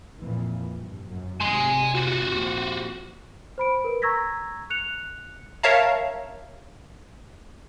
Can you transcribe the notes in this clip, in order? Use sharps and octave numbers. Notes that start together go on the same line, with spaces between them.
F2 A#2 E3
G2
F#2
G#1 C3 G#5 C6
F4 F#4
A#1 D#2 C4
C5 B5 D7
A#4 B4
A#5 C#6 E6 G#6 A#6 B6
F#6 C#7 F7
A#4 C#5 E5 F5 A5 A#5